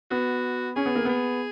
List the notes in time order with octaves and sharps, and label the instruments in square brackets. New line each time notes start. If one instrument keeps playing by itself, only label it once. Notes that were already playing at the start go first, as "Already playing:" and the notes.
[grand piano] B3 [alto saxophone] F#4
[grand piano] C#4 [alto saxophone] G#4
[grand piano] B3
A#3
[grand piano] B3 [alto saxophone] G#4